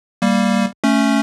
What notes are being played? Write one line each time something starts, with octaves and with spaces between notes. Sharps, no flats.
G3 A#3
A3 C#4